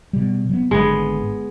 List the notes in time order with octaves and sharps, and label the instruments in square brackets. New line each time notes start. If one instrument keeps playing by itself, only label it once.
[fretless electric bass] B2 G3
F#3 G3 B3
[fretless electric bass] G#1 D3 [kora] G#3 B3